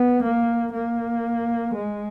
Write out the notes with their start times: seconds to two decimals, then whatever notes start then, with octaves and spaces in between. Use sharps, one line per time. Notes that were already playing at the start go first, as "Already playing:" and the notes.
Already playing: B3
0.24 A#3
0.73 A#3
1.75 G#3